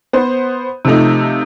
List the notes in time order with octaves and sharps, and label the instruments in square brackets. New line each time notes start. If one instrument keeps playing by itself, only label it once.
[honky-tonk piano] B3 C5
C3 F3 A3 D#4